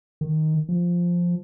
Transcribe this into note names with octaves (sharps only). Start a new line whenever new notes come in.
D#3
F3